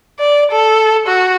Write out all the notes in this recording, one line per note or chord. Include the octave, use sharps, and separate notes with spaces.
D5
A4
F#4